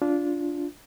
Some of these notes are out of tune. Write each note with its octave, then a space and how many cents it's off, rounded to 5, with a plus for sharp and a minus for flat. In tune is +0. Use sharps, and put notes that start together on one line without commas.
D4 -15 F4 +0